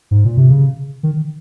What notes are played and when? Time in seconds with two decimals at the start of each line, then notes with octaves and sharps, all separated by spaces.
0.11 G#2
0.25 A#2
0.37 C3
0.50 C#3
1.03 D#3